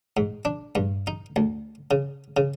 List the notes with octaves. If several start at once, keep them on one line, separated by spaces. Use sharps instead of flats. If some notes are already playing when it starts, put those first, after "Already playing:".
G#2
D4
G2
D#4
D2
C#3
C#3